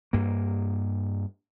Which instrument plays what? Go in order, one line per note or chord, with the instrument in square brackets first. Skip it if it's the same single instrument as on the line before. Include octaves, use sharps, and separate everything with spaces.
[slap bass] G2 A#3